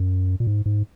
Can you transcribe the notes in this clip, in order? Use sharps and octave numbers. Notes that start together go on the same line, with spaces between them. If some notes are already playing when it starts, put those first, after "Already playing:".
Already playing: F#2
A#2
G#2
G#2